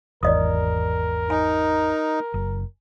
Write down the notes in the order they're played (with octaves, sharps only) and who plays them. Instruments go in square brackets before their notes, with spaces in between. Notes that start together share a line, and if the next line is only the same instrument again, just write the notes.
[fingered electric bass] G#1 E2 [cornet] A#4 [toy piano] D5 D#5 D#6
[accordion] D#4 [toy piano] G#5
[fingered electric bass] F#1